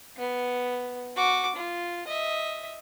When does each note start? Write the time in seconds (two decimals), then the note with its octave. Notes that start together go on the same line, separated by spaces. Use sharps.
0.17 B3
1.16 F#4 D6
1.56 F4
2.07 D#5 E5